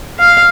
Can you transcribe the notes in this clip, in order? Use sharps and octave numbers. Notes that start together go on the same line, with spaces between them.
F5